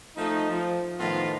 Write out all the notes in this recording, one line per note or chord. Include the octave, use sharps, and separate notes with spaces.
F3 A3 D#4
F3
A2 D#3 F3 B3 F4